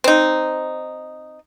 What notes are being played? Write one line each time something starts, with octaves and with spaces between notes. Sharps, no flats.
C4 D#4